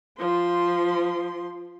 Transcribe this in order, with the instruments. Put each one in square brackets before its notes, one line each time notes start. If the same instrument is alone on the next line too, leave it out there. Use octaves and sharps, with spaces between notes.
[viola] F3 C6